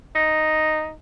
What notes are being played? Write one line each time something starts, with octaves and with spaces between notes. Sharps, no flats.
D#4